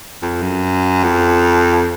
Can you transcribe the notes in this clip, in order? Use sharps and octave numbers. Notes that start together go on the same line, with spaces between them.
F2
F#2
F2